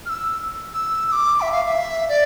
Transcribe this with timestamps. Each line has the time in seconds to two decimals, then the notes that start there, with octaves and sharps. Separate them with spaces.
0.06 F6
0.10 E6
0.73 E6
1.08 E6
1.12 D6
1.41 E5
1.52 F5
1.64 F5
1.67 E5
2.09 D5